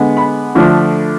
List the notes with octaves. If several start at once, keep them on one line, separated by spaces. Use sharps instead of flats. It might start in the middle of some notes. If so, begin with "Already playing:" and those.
Already playing: D3 G#3 B3
B5
D3 F3 A3 D4